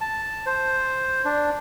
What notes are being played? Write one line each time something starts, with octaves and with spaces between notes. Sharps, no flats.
A5
C5
D4